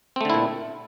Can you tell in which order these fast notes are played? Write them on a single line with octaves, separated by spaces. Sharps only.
C4 A3 D3 E4 A#2